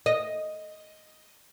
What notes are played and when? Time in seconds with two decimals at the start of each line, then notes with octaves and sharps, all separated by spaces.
0.06 D#5